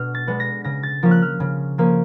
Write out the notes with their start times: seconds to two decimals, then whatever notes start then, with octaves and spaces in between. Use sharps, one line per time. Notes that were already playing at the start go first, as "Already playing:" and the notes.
Already playing: B2 B3 D4 F6
0.15 A6
0.27 G#3 B3 D4
0.40 A#6
0.64 C#3 A#6
0.83 A6
1.03 F3 A#3 C#4
1.11 F#6
1.22 F6
1.40 C#3
1.78 F3 A#3 C#4